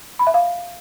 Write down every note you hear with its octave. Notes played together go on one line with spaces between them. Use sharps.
B5
E5
F5